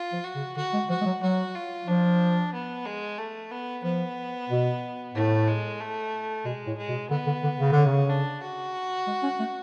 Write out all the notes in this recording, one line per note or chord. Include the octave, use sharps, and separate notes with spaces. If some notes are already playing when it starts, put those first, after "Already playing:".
Already playing: F4
F3
F#4
C#3
D3 F#4
G#3
F3 F#4
G#3
F#3
F#3 F#4
F4
F3 D4
B3
G#3
A3
B3
F3 B3
B2
A2 A3
G#3
A3
B2 G#3
A2
G#3
B2
D3 B3
D3
D3
C#3
D3 C#4
C#3
D4
F#4
G#3
C#4
A3